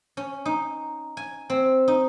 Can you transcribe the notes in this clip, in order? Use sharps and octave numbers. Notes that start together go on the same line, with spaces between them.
C#4
D#4
G#5
C4
D#4